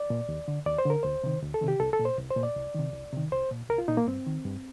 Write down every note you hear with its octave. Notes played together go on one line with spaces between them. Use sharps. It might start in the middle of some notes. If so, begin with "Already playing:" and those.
Already playing: D5
A#2
D#2
D3
D#2 D5
C5
D3 A#4
D2 C5
C3 D#3
D2
A4
C3 D#3
G4
C2 A4
A4
A#2
C5
C2
C5
A#2
D5
C2
C3 D#3
C2
C3 D#3
C2 C5
A#2
C2 A#4
F4
A#2 D#4
A#3
G2 C4
D#3
G2